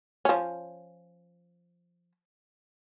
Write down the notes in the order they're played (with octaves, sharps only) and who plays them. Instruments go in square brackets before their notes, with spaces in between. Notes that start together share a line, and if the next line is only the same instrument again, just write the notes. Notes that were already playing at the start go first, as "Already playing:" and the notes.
[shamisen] F3 C#4